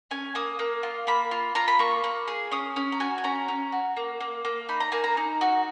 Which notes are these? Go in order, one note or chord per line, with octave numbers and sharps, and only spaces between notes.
C#4 G#5
A#3 D#6
A#3
F4
A#3 B5
F4
F4 A#5
B5
A#3 C#6
A#3
G#4
C#4 D#6
C#4
A#5
F#4 G#5
G#5
C#4 A#5
C#4
F#4
A#3
A#3
A#3
D#4 B5
A#5
A#3 G#5
A#5
D#4
F#4